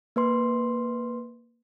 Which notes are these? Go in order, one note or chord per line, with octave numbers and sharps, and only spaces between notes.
A#3 B4 C6